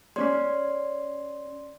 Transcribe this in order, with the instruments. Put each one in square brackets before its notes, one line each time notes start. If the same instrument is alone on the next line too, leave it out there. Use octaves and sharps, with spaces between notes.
[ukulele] C#4 D4 C#5 [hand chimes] D5 C6